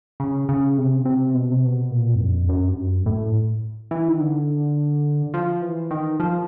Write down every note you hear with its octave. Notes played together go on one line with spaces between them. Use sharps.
C#3
C#3
C3
C3
B2
C3
B2
A#2
F#2
F2
F#2
G2
F#2
A2
E3
D#3
D3
F3
E3
D#3
F3